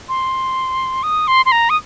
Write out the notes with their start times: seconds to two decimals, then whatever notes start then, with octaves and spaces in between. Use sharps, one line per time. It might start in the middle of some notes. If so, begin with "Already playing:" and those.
0.09 C6
1.03 D#6
1.27 C6
1.46 C6
1.52 A#5
1.70 D#6